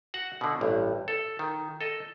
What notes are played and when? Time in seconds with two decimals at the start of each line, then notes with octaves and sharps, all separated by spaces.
0.14 F#4 F#5
0.41 B2 D3
0.61 A1 G2
1.08 A4
1.39 D#3
1.81 A4 D#5